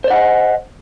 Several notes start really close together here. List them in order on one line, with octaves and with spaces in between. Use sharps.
C5 D5 F#5 D#5